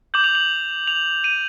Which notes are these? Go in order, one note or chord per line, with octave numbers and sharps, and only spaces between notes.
D6 G6 F#7
F7
F#7
F7
D#7